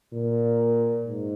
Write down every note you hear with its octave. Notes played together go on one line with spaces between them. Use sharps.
A#2
G#2